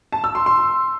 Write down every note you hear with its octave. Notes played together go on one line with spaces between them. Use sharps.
A5
E6
C6
C6